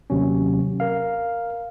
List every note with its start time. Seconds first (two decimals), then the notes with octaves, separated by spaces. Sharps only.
0.10 D#2 C3 F#3 C#4
0.80 A#4 F5